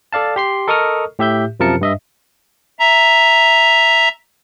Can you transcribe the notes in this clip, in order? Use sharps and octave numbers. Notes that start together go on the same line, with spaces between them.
A4 D5 F5 A5
G4 C6 C7
A4 A#4 D#5 C#6 D#6 F6
A2 G4 E5 G6
F#2 C3 F3 A#4 A5 C#7
G2 D#5 E5
E5 A#5